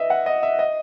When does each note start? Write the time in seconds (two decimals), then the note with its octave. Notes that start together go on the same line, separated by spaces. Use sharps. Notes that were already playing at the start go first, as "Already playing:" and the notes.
Already playing: B4 D#5 E5
0.10 F#5
0.26 D#5
0.43 E5
0.59 D#5